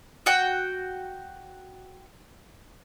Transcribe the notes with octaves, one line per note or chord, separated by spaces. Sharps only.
F#4 F#5 G5